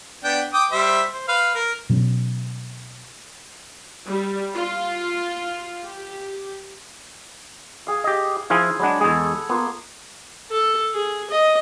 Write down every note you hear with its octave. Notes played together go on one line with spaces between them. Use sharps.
B3 D4 G5
G5 D6 D#6
G3 C5 E5
C5
B4 F5
A#4
B2 F#3 C4 C#4
G3
F4
G4
G#4 F5
G4 D#5
F3 E4 F4 G#4 C5 G#5
F#3 G#3 D4 F#5 B5
E2 G#3 G#4 A4
A#3 B3 F4 C6
A4
G#4
D#5